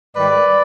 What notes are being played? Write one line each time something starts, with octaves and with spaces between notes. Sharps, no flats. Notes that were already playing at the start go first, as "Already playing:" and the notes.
G#2 D#3 G3 B4 D5